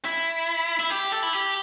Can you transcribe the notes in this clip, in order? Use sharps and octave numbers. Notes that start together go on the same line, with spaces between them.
E4
E4
G4
A4
E4
G4